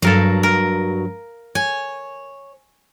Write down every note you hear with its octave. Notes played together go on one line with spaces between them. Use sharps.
G2 F#3 A4 A#4 F5
A#4
C#5 G#5